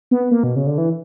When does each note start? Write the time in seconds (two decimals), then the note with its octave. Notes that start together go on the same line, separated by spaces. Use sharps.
0.11 B3
0.31 A#3
0.43 B2
0.56 C#3
0.67 D3
0.78 E3